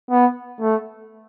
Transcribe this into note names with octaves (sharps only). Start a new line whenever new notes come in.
B3
A3